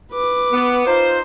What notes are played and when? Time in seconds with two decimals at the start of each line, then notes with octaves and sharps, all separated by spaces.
0.12 B4 D6
0.51 B3
0.86 D#4 F4 C5